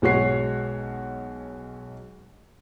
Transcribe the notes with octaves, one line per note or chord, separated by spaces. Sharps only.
B1 G#3 F#4 C#5 C7